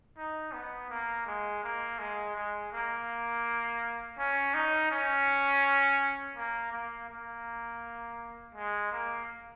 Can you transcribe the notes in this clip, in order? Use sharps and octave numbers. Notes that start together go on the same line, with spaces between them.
D#4
B3
A#3
G#3
A#3
G#3
G#3
A#3
C#4
D#4
C#4
A#3
A#3
A#3
G#3
A#3